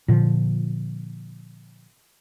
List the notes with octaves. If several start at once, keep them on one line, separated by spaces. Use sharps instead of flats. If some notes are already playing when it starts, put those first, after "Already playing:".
A#2 D3 F3